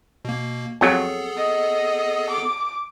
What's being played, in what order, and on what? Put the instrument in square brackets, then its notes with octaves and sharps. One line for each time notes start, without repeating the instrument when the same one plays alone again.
[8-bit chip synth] B2 A#3
[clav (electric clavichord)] F2 F#3 [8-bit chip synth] B3 G#4 A4
[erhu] D#5
D6